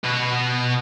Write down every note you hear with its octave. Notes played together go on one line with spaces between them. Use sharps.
B2 B4